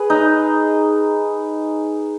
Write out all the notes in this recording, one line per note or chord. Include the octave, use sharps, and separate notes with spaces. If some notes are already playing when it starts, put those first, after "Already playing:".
Already playing: G#4 B4
D#4